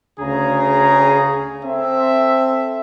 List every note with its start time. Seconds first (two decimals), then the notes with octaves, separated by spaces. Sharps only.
0.20 D2 C#3 G#4 A#5
1.64 C4 A4 E5